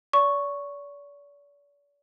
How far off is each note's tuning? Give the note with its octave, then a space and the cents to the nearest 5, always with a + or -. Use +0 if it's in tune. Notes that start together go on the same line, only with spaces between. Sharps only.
D5 -40 C#6 +0